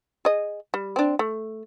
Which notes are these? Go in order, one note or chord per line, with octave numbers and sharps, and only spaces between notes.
G#4 D#5
G3
C4 D4
A3